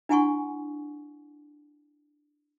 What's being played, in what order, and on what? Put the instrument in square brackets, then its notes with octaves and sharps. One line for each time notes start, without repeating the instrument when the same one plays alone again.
[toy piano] D4 E4 F#5 G#5 C6 C#6